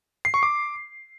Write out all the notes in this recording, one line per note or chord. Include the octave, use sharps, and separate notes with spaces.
C7
C#6
D6